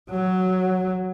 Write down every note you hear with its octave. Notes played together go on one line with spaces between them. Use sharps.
F#3